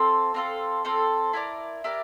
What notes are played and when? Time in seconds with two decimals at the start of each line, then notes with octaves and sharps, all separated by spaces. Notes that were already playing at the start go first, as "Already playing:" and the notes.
Already playing: C4 F4 A4
0.34 C4 F4 A4
0.85 C4 F4 A4
1.33 E4 G4 A#4 D5
1.84 E4 G4 A#4 D5